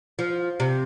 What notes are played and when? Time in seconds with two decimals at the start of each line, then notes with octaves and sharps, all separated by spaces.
0.19 F3
0.60 C3